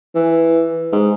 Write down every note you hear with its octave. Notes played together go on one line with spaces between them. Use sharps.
E3
G#2